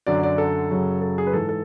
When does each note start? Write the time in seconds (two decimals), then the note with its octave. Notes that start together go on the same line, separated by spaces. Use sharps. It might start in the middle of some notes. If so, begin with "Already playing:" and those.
0.07 F#2 D3 F#3 D5
0.23 D5
0.38 A4
0.71 F#2 C#3 F#3
1.01 A4
1.18 G#4
1.27 B4
1.33 G#2 E3 A4
1.49 A4